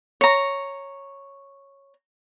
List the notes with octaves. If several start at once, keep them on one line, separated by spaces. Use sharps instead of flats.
C#5 A#5